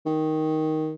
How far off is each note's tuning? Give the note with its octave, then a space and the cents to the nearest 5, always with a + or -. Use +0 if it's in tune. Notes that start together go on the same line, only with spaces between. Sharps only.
D#3 +5